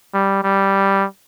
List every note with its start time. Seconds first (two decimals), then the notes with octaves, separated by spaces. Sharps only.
0.14 G3
0.43 G3